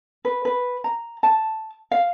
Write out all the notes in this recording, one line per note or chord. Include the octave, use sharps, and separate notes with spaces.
B4
B4
A#5
A5
F5